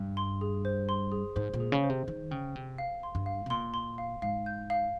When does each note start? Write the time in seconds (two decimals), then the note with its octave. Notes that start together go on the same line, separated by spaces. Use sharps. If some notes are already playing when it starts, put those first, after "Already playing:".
Already playing: G2
0.17 C6
0.41 G#4
0.65 C5
0.89 C6
1.12 G#4
1.36 G#2 C5
1.54 A#2
1.60 G#4
1.72 C#3
1.84 C5
1.90 C3
2.07 D#3 C5
2.31 C#3 G5
2.55 C3 G5
2.78 F5
3.03 C6
3.15 G2
3.26 F5
3.46 C3
3.50 A#2 C6
3.74 C6
3.98 F5
4.22 G#2 F5
4.46 G6
4.70 F5